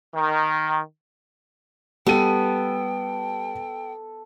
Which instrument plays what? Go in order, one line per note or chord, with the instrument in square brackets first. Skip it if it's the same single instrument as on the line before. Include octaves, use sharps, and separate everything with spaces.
[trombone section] D#3
[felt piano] G3 D#7 [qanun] B3 [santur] A4 [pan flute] G5